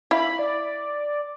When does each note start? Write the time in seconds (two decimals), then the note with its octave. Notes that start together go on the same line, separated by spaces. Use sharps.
0.11 E4 F5 B5
0.39 D5